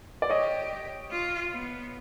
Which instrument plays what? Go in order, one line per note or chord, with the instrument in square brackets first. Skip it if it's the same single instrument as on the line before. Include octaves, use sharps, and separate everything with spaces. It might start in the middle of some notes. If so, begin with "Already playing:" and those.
[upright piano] D5
[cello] G4 [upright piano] C#5 D#5
[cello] F4
B3